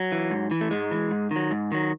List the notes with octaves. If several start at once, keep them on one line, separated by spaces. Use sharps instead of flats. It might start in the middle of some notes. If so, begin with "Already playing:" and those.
Already playing: F#3
E3
G#2
E3
A3
G#2 G#3
E3
G#2
D#3 F#3
G#2
D#3 F#3